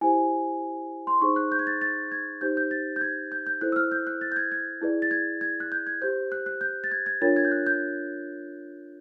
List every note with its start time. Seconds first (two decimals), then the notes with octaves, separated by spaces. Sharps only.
0.01 E4 G4 C5 G#5
1.07 C6
1.21 D#4 G#4 C5 C#6
1.36 F#6
1.52 G6
1.59 G#6
1.67 A6
1.82 A6
2.12 G#6
2.41 D#4 G4 C5 G6
2.57 G6
2.71 A6
2.96 G6
3.01 G#6
3.32 G6
3.46 G6
3.61 E4 A4 C5 F#6
3.72 E6
3.76 F6
3.92 G6
4.07 F#6
4.21 A6
4.32 G6
4.36 G#6
4.52 G#6
4.82 E4 G#4 B4 D5
5.02 A6
5.11 G#6
5.41 G#6
5.60 F#6
5.72 G6
5.87 G#6
6.02 G4 C5 G6
6.32 F#6
6.46 F#6
6.61 G6
6.84 A6
6.92 G#6
7.06 G#6
7.22 D4 F4 A#4 C#5 A6
7.36 G#6
7.45 G6
7.51 F#6
7.67 G6